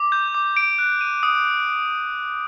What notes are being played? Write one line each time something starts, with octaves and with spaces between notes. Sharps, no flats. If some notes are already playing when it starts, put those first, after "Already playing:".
Already playing: D6
G6
D6
D7
F#6
D#7
D#6